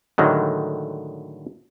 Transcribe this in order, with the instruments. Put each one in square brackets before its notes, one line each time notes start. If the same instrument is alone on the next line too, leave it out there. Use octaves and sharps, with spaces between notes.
[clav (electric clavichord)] A2 D3 D#3 F#3 G#3